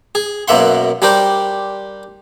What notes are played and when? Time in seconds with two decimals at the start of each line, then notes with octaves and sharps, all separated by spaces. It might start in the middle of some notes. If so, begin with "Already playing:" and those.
0.15 G#4
0.48 F#2 B2 A#3 E5 F#5 C6
1.02 G3 D4 G4 A#4 C5